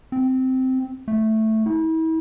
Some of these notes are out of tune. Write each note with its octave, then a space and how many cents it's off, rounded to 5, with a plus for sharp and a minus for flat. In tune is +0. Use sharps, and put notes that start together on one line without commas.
C4 -10
A3 +0
E4 -40